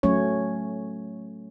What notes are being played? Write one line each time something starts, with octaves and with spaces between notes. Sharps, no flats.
F#3 A3 C#4 C#5